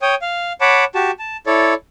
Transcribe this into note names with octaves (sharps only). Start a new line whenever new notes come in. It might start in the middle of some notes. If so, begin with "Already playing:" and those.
C#5 G5 D#6
F5
C#5 F#5 A5 B5 D6
F#4 G4 A5
A5
E4 A4 C#5 D5